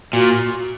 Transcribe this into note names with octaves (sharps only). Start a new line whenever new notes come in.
A#2 F#4